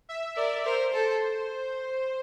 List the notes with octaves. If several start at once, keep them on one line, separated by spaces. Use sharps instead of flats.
E5
A#4 D5
A#4 C5
A4